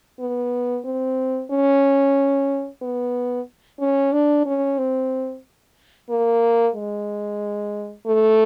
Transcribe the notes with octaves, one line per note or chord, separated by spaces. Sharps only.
B3
C4
C#4
B3
C#4
D4
C#4
C4
A#3
G#3
A3